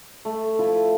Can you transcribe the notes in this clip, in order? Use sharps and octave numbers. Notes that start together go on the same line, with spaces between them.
A3
F3 E4 F4 A5